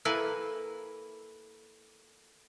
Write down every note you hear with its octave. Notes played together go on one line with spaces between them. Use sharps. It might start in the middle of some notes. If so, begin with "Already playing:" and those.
A#3 E4 A4 B4 G#5